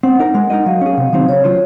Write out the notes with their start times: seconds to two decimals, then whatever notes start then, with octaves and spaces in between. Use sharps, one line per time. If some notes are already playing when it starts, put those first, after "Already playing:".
0.03 C4 F#5
0.19 D#4 A#4
0.34 G#3
0.50 D#4 A#4 D#5
0.66 F#3 F5
0.81 C#4 G#4
0.98 C3
1.13 D#3 F#3 C4 D#4
1.28 C#3 C#5
1.44 F#3 C#4 F4 C5